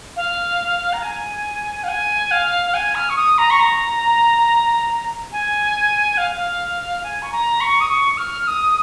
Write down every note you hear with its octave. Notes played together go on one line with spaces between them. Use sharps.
F5
A#5
G#5
F5
G#5
F5
F5
G#5
F6
C#6
D#6
A#5
C#6
A#5
G#5
F5
F5
G#5
C#6
A#5
C#6
D#6
C#6
F6
D#6